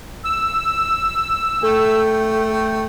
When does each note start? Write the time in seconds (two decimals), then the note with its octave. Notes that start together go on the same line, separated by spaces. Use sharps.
0.24 E6
1.63 A3 A4 G5